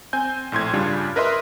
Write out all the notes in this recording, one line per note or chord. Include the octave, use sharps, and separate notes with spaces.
C4 G#5 G6
A#1 A2 C6 G#6
G2 C#3 G3 D4 F4 G4
A#4 B4 D#5 E5 C6